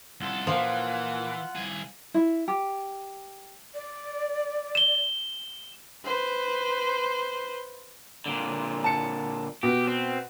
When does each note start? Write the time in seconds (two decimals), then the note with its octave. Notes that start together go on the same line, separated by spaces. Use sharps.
0.21 C2 F4 A4 F#5
0.47 A#2 E3 F3
1.56 C2 G#4
2.14 E4
2.48 G4
3.74 D5
4.75 E7 G7
6.05 B4 C5
8.26 A#2 D3
8.84 A5 C#7
9.63 B2 G4
9.87 C4